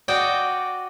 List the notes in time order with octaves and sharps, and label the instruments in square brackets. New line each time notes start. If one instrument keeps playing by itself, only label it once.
[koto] F#4 D5 D#5 G5